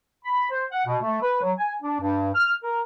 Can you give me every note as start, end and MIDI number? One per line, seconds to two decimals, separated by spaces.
0.25 0.47 83
0.50 0.64 72
0.72 0.86 78
0.86 0.97 47
1.03 1.22 57
1.22 1.40 71
1.42 1.52 54
1.58 1.72 80
1.82 1.97 62
2.00 2.30 43
2.35 2.53 89
2.63 2.81 70